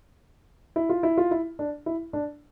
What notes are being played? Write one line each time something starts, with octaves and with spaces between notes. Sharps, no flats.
E4
F4
E4
F4
E4
D4
E4
D4